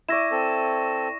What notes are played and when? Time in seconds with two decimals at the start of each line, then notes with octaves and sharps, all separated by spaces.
0.09 E4 D5 C#6 A#6 E7
0.31 C4 A4